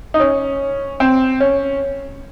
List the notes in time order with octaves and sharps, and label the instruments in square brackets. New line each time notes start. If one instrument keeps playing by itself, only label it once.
[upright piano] D#4
C#4
C4
C#4